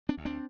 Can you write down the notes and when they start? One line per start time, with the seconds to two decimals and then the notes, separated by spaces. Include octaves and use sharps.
0.09 C4 D4
0.17 D2
0.25 C4 D4